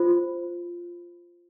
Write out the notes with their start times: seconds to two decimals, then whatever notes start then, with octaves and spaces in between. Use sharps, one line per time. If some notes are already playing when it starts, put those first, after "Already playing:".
Already playing: F4 C5